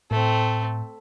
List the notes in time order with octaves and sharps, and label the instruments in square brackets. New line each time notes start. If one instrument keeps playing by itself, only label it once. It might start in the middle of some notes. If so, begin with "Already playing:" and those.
[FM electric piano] A2 [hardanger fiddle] A3 C4